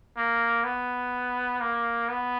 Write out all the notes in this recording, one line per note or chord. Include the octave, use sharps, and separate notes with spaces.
A#3
B3
A#3
B3